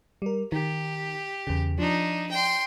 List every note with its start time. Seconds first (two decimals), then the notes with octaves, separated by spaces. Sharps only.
0.22 G3 A#4
0.52 D#3 G4
1.47 E2 C#3
1.78 F3 D4 D#4
2.31 G5 C6